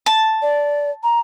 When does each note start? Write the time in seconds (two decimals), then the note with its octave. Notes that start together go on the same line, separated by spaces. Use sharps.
0.06 A5
0.42 D5
1.03 A#5